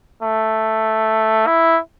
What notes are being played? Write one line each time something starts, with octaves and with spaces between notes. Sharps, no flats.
A3
E4